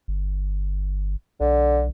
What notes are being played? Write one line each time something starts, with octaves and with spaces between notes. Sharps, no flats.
G1
B1 D3